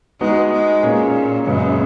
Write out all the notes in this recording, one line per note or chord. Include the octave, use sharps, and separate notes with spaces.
G#3 B3 D#4 F#4
G#3
A#2 A#3 C#4 G#4
F#2 C#3 G#3 B3